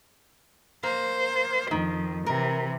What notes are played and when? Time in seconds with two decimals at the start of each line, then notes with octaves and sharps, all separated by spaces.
0.83 A#3 C5
1.71 F2 D#3
2.26 C3 E3 A#4